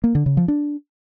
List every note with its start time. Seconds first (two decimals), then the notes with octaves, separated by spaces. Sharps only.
0.04 A#3
0.15 D3
0.26 C#3
0.37 F3
0.48 D4